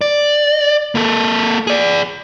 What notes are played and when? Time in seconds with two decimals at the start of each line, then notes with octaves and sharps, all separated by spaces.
0.01 D5
0.95 A#3 A4
1.67 G#4 D5